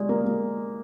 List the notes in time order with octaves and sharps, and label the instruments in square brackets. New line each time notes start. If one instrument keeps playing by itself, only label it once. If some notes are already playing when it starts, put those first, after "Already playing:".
Already playing: [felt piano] G#3 [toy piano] G4 D5
[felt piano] A#3